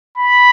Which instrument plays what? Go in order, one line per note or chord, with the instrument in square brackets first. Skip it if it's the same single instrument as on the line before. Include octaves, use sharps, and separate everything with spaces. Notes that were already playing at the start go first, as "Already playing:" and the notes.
[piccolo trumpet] B5